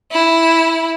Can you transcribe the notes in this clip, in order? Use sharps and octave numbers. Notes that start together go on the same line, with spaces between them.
E4